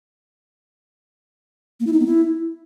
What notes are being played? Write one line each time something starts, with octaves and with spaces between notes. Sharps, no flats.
A#3
E4
D#4
B3
E4